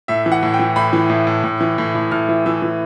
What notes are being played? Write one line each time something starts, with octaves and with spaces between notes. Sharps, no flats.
A2 E5
E3
F#5
A2
G5
E3
A2 B5
E3
A2
A2
A2
E3
A2
A2
A2 F6
E3
E3 E6
E3